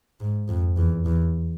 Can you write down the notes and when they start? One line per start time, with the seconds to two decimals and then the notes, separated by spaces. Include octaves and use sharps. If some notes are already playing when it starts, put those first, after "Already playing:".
0.20 G#2
0.49 F2
0.77 E2
1.06 E2